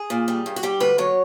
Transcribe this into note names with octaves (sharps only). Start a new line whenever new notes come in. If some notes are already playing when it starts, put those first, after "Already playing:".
Already playing: G#4
A#2
G3
G2
F#4
G3 G4
D2 B4
F#3 C#5